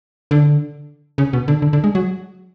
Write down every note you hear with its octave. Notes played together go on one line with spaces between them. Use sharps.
D3
C#3
B2
D3
D3
D3
G#3
F#3